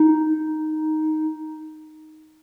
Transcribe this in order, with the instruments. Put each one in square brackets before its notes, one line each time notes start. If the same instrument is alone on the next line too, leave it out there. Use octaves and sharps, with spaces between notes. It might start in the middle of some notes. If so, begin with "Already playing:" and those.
Already playing: [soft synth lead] D#4